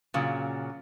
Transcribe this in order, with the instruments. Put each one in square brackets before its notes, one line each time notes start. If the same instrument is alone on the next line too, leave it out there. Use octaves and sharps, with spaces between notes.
[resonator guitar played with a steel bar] A#2 C#3 F#3